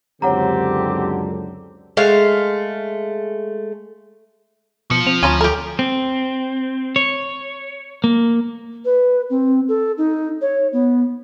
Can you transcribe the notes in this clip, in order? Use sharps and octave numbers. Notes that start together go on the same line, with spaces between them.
C#2 F#2 D3 C4 G4 C#5 F#5 A#5
G#3 A3 F5
B2 F3 C#7
C4 F7
D2 C#4 F4 A#5 D#7
G4 A4 A#4
C4
C#5
A#3
B4
C4
A4
D#4
C#5
B3